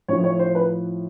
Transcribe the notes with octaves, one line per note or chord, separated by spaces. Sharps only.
A2 F3 C#5
C#5
C5
B4